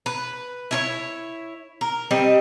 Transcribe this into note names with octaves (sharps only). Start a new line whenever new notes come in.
B4
E4 F4 C#5
A#4
G3 C4 D#5